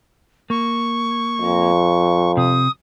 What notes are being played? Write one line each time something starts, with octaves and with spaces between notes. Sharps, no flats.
A#3 C#6
F2
C3 D#6